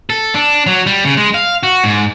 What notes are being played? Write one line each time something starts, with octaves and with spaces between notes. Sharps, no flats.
A4
D4
F#3
G3
C#3
G#3
F5
F#4
G#2